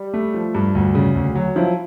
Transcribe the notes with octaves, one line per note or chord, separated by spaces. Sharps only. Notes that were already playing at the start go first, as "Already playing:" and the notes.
Already playing: G3
A3
F3
G2
D2
C#3
D2
F#3
F3 E4